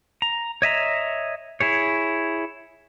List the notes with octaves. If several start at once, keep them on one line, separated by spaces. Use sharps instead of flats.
A#5
C#5 D#5 E5 A#5
E4 G#4 C#5